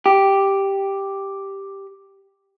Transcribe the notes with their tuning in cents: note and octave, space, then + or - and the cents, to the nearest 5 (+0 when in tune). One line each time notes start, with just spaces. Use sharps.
G4 +0